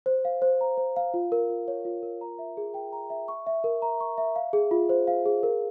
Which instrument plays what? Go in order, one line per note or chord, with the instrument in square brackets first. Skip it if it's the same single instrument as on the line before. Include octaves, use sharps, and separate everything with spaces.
[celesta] C5
F5
C5
A#5
C5
F5
F4
A#4
F4
C#5
F4
A#4
A#5
E5
G#4
G5
A#5
E5
C#6
E5
A#4
A#5
C#6
E5
F5
G#4
F4
C5
F5
G#4
A#4